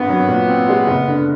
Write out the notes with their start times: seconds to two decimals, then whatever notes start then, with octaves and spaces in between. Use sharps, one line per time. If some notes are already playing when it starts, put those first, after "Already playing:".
Already playing: G#1 G2 B3
0.09 F#3
0.28 A#2
0.48 C4
0.69 G#3
0.87 F#1
1.08 D3